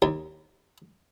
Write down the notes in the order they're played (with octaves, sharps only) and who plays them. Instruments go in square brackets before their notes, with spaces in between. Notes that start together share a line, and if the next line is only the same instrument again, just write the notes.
[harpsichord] D#2